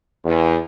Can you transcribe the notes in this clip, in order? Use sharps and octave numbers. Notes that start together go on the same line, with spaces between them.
E2